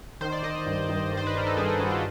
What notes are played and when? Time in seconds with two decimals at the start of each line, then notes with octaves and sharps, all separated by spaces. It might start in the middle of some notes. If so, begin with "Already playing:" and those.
0.21 D#3 C5
0.32 D5
0.43 D#3 D#5
0.66 G2
0.89 G2
1.12 D#3
1.17 C5
1.27 B4
1.35 D#3 A#4
1.47 A4
1.57 G2 G#4
1.69 G#4
1.79 G2 F#4
1.91 F4